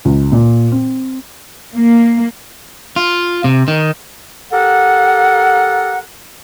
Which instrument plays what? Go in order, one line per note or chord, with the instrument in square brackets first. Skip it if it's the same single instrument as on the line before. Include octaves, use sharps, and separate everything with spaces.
[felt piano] C#2
A#2
C4
[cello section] A#3
[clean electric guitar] F4
C3
D#3
[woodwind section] G4 A4 A#4 F#5